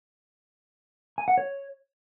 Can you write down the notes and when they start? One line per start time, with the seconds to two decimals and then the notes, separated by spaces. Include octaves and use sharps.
1.18 G#5
1.28 F#5
1.38 C#5